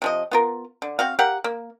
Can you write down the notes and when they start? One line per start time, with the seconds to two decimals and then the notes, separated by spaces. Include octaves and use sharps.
0.02 C3 F3 D#5
0.31 B3 F4 A#4
0.82 D3
0.99 C4 F#4 F5
1.19 G4 A#4 F5 F#5
1.44 A#3